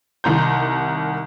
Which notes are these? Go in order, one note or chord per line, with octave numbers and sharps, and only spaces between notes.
C2 D#3 A#5 C6 G6